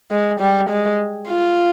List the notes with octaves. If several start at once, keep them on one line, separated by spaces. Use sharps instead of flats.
G#3
G3
G#3
F4